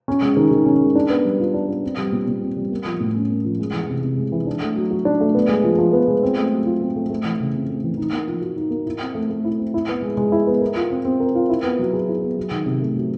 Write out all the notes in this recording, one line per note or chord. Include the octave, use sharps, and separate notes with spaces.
C#4
G#3
D#3
D#3
C#4
G#3
D4
B3
G3
F4
D4
B3
C4
G3
A#2
A#2
C4
G3
A#3
F3
A2
C#4
A#3
F3
G#3
E3
C3
C3
G#3
E3
D4
A3
F#3
F#4
D4
A3
B3
G#3
F3
F3
B3
G#3
C4
A3
F#3
F4
C4
A3
A3
E3
C#3
C4
A3
E3
D#4
A#3
F3
F#4
D#4
A#3
E4
C4
A3
A3
E4
C4
E4
B3
G#3
G#3
E4
B3
A#4
F4
C4
C4
A#4
F4
E4
B3
F#3
G#4
E4
B3
F#3
D#3
C3
A3
F#3